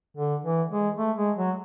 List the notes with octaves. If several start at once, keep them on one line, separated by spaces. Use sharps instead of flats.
D3
E3
G#3
A3
G#3
F#3